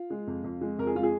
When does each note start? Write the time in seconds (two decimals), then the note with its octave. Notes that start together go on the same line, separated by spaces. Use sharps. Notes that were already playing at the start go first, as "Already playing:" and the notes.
Already playing: F4
0.10 G#3
0.27 F2
0.44 F2
0.61 G#3
0.78 F2 A#4
0.87 G#4
0.95 G#3 F4
1.03 G#4